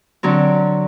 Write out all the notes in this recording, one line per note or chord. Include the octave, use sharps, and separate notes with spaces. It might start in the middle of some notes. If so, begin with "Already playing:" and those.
D3 F#3 C4